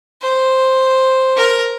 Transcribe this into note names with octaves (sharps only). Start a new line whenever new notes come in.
C5
A#4